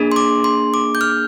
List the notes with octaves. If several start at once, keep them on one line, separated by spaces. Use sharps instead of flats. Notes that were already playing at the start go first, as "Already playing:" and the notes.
Already playing: A#3 D4 G#4
C6
D6
C6
D6
G6
F6